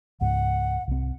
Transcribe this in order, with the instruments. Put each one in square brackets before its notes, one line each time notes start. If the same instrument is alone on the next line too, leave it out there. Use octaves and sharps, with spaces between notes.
[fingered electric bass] C#2 G#2 [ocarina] F#5
[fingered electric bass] C2 C4